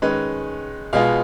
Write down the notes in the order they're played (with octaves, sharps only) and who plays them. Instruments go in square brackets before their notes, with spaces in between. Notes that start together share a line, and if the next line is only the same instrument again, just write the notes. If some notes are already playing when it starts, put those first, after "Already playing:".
[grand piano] D#3 G#3 C#4 B4
B2 G#3 B3 F4 F5